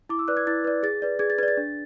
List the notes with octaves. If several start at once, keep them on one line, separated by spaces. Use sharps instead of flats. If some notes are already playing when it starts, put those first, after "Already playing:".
E4 D6
E6
B4 D5 F#6
G#6
E4 A6
B4 D5
G#4 A6
B4 D5
G#4 G#6
A6
B4 D5 G#6 A6
D4